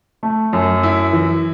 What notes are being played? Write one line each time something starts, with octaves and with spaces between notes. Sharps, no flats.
A3
F#2
E4
E3